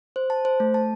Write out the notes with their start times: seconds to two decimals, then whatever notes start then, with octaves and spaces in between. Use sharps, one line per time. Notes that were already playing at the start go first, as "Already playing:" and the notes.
0.16 C5
0.30 A5
0.45 C5
0.60 A3
0.74 A5